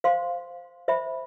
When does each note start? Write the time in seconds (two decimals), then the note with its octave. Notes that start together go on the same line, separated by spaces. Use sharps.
0.04 C5 F5 C6
0.88 C5 E5 B5